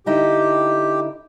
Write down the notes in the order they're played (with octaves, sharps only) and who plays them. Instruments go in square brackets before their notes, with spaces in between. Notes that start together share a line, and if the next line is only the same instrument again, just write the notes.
[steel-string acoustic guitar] D3 D#4 E4 [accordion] G4